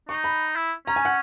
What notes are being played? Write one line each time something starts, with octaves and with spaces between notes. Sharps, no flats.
D#4 C#6
B5
E4
C#4 A#5
G#5
F#5